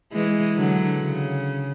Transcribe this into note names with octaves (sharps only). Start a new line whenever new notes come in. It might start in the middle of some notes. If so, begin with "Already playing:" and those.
E3 G#3
D3 F#3
C#3